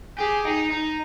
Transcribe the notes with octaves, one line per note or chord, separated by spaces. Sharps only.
G4 G#4
D#4
D#4